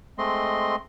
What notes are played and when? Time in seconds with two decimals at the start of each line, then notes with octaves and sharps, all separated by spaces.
0.18 G#3 A3 C4 D#5 C6